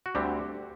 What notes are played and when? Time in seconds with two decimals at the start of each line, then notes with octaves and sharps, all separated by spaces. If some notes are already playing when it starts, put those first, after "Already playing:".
0.06 F#4
0.15 D2 D3 G3 C4 G4